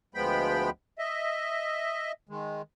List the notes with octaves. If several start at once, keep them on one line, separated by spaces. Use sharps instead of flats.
D2 F3 G#3 B3 G5 B5
D#5 E5
D#3 G#3